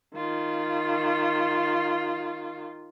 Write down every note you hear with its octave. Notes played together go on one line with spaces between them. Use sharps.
D#3 F4